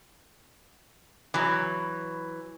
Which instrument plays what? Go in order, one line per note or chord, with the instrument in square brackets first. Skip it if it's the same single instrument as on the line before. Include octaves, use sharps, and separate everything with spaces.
[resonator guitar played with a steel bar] E3 F#3